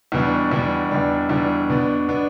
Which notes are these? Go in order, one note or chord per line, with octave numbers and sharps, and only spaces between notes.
E2 B2 G3 D4
E2 B2 G3 D4
E2 B2 G3 D4
E2 B2 G3 D4
B2 B3 D4
B2 B3 D4